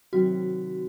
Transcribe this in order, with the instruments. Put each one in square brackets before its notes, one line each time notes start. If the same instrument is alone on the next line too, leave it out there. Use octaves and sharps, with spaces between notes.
[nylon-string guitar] C3 D#3 F#3 C4 [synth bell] F#4